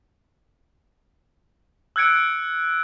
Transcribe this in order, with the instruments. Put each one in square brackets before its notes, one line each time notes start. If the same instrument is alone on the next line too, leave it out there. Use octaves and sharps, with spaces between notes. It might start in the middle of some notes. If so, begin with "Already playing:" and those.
[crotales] E6 F#6 G#6 C#7 D7